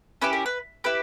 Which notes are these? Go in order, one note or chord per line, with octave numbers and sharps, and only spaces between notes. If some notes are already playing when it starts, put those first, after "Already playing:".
C#4 E4 G4 B4
A#4
B4
E4 G4 B4